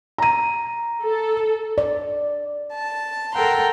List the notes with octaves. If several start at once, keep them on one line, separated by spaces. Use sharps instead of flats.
A#5 D#7
A4
D5
A5
A4 A#4 F#5 G5 A#5 C6